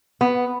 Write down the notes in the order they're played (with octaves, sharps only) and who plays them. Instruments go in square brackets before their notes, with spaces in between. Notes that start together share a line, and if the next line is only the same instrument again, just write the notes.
[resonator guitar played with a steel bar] B3